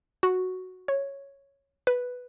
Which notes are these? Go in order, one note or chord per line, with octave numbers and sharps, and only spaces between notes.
F#4
C#5
B4